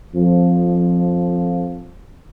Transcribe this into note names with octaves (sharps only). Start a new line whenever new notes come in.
F2 F3